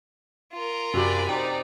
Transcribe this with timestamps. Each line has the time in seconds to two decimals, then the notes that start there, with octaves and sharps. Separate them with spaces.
0.53 F4 A#4
0.94 F#2 C3 F#4 G4 D5 G#5 B5
1.29 D#4 C5 D5 G5